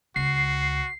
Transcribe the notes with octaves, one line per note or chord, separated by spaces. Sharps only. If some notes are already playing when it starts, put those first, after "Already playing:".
C#2 F#4 C7